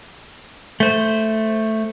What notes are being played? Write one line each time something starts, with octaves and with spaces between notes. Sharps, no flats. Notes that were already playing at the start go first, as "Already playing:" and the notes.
A3 C5